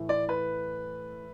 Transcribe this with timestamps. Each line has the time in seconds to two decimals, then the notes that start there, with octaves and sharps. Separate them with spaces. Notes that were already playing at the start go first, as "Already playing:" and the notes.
Already playing: A2 E3 A3
0.09 D5
0.29 B4